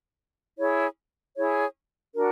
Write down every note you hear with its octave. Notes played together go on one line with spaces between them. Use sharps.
E4 G#4 C#5
E4 G#4 C#5
D4 F#4 A#4